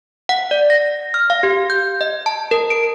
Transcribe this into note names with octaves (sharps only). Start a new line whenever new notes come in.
F#5
D5
A#6
F6
F5
G4
G6
D#5
A5
A#4
D7